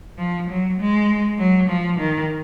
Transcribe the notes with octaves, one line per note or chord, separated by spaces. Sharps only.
F3
F#3
G#3
F#3
F3
D#3